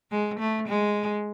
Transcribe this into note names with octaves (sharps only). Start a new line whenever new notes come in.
G#3
A3
G#3